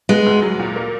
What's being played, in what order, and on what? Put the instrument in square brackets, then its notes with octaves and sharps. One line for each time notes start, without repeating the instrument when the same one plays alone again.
[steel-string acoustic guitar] G#3 [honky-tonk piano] B3
[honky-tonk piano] D2
F#3
A#2
A#3